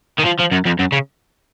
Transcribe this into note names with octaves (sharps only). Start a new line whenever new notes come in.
D#3
F3
F3
F#2
F2
F#2
C#3